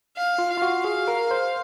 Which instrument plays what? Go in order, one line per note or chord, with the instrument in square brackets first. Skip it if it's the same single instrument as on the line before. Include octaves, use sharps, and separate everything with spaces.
[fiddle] F5
[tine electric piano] F4
[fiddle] F5
[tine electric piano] F4
F#4
[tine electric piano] G#4 [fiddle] F5
[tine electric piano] A#4
C5